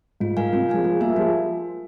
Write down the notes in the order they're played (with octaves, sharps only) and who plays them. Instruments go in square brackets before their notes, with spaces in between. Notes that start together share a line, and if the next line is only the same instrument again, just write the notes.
[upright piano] G#2 [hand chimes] F4
[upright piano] G#2 [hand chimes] A#4 F5 G#5
[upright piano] G#2 C3 [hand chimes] F4
[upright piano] F3 G#3 [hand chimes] A#4 F5 G#5
[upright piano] F3 G#3 [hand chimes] F4
[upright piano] G3 A#3 [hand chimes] A#4 E5 G#5
[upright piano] F3 G#3 [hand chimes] F4